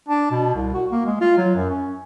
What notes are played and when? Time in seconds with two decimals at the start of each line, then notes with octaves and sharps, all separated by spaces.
0.09 D4
0.31 B2
0.55 C2
0.74 F#4
0.92 A#3
1.06 G#3
1.21 F4
1.37 F#3
1.55 F#2
1.70 C#4